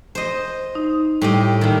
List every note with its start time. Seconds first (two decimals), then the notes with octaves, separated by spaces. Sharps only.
0.15 C5 D#5
0.75 D#4
1.21 A2 G3 G4 D#5
1.61 A#2 D#3